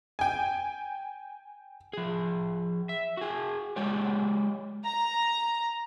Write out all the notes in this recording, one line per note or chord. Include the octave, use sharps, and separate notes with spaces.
G5 G#5
F3 G#4
E5
F#4 G#4
G#3 G4 C#5 D5
A#5